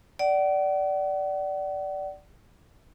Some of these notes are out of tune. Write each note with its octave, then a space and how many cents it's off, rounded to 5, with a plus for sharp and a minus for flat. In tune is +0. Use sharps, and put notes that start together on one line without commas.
D5 -5 F#5 +40